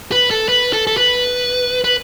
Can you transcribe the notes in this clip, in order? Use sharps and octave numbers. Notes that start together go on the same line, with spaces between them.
B4
A4
B4
A4
A4
B4
B4